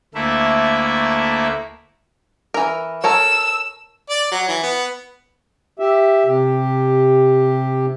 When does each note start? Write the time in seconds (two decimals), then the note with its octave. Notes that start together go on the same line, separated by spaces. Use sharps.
0.14 D2 A3 A#3 E4 E5
2.54 E3 A#4
3.04 A4 A#4 C#5 E6
4.09 D5
4.32 F#3
4.49 E3
4.63 B3
5.79 G4 E5
6.25 C3 G4